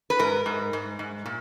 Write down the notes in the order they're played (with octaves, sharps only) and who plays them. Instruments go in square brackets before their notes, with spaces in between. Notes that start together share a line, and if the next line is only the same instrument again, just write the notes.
[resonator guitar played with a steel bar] B4
G#2 A#4
G#2
G#2
G#2
A#2